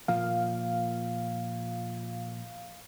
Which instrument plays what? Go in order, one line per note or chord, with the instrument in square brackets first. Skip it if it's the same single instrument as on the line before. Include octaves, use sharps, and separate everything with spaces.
[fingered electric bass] A#2 F3 A#3 [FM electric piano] F5